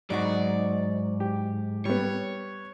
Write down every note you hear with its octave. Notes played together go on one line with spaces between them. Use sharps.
G#2 F#3 D#4 F#4 D5
G4
G3 B3 C#5